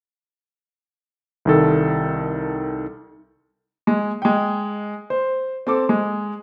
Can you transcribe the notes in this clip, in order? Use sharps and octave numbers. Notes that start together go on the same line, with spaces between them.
C2 D#3 A4
G#3
G#3 G5
C5
C4 A4 D6
G#3